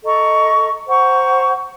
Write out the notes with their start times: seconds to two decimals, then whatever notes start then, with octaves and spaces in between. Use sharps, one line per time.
0.03 A4 D#5 A#5 C#6
0.86 C5 F#5 A#5 C#6